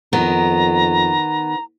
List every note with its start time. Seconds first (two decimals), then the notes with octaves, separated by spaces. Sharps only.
0.13 F2 D#3 B3 A#5